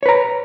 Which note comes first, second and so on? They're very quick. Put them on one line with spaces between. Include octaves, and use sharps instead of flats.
C#5 B4 A#5